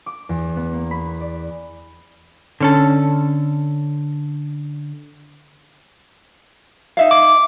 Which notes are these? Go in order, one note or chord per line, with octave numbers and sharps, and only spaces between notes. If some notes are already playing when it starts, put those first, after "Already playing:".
D6
E2
B3
A#3
B5
D5
D3 C#4 A4
D#4 E5 F5
D6